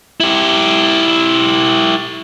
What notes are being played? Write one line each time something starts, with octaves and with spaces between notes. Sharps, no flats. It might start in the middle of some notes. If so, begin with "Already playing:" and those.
E4 G4